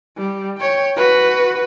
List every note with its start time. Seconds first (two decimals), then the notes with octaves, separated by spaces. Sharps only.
0.17 G3
0.58 C#5 G5
0.96 F#4 B4